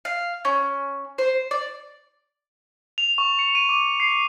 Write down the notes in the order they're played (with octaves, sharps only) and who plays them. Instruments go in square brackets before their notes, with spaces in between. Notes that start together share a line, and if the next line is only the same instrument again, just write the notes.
[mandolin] F5
C#4
C5
D5
[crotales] F7
C#6
C#7
D#7
D6
C7